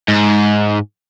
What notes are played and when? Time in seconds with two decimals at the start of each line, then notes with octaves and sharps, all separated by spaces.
0.08 G#2